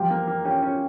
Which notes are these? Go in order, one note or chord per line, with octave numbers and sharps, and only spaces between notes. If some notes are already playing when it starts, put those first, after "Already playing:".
Already playing: F3 G4 G5
A#3
A#3
C#4 G4 G5
C#4